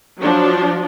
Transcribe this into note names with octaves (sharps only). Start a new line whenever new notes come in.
F3 F#3 D4